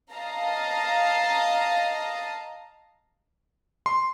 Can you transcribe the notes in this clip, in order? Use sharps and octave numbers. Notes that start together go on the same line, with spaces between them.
D#5 F5 A5 A#5
C6